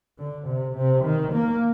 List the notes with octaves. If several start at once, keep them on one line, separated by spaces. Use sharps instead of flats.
D3
C3
C3
D#3
A#3